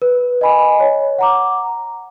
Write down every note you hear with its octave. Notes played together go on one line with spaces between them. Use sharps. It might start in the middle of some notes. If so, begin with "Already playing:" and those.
B4
D#5 G#5 B5
C#5
F#5 A#5 D6